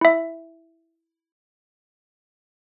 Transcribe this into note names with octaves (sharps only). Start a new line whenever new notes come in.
E4 E5